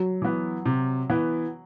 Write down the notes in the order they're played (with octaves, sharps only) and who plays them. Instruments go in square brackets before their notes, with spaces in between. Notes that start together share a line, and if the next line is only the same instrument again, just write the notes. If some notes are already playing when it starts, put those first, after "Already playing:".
Already playing: [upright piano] F#3
[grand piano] E3 B3
C3
E3 B3